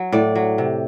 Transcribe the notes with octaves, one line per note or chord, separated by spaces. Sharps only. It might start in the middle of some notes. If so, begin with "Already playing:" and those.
Already playing: F#3
A2 D5
F#3
C3